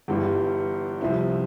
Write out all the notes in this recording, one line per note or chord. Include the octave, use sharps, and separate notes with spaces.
G1 G2 E3 G3
C2 C3 F3 C4 E4